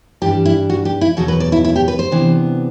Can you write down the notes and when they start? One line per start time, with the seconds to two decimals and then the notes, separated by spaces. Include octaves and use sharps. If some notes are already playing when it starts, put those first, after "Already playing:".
0.22 G2 E3 G3 D4 G4
0.45 E4
0.69 F#4
0.85 G4
1.01 E4
1.17 E2 B2 F#3 F#4
1.28 B4
1.40 D5
1.52 E4
1.65 E4
1.76 G4
1.88 B4
1.99 C5
2.11 C3 E3 B3 D4